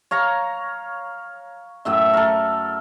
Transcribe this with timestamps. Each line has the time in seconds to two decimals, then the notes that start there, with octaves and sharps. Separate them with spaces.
0.11 C#5 F5 A#5
1.85 F#2 A2 E5
2.14 A4 A#4